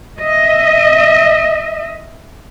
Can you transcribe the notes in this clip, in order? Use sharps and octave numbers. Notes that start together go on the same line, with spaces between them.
D#5 E5